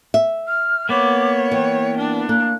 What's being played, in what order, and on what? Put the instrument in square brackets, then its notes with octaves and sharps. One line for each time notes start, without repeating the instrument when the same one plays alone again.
[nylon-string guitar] E5
[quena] F6
[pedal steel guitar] A#3 B3 [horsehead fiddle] C#5 [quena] D6
[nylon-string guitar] E3 [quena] G5
[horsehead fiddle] D4
[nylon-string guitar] A#3 [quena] F#6